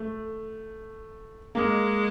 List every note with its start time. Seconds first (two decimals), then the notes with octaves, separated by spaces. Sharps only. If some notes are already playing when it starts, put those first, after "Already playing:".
Already playing: A3
1.55 G#3 A#3